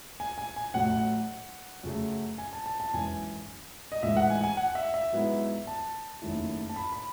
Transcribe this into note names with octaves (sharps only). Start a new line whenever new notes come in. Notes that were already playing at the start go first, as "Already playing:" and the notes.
G#5
G#5
G#5
A1 A2 F#3 A3 F#5
F#2 C#3 F#3 A3
G#5
A5
A5
A5
G#1 F#2 E3 G#5
D#5
A1 G#2 E3 G#3 E5
F#5
G#5
G#5
F#5
E5
E5
G#2 F#3 B3 E4
A5
F#1 F#2 D#3 A3 E4
A5
B5
B5